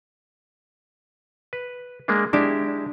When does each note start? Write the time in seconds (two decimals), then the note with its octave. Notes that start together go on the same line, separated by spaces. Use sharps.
1.53 B4
2.08 G#3 A#3 D4
2.33 G#3 D4 E4 G4